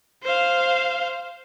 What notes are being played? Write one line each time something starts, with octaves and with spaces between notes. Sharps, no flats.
C5 F5